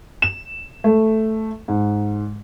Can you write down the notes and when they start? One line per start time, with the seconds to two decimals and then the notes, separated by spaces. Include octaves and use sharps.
0.22 E7
0.84 A3
1.68 G#2